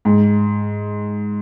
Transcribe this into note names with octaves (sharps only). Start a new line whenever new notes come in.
G#2